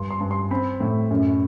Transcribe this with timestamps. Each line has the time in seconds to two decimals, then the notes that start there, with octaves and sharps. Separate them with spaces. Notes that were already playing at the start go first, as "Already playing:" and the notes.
Already playing: G2 C6
0.11 C6
0.21 G2
0.31 C6
0.51 C4 B5
0.81 A2
1.11 F#2